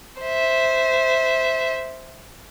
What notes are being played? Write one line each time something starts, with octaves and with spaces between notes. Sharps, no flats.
C5 E5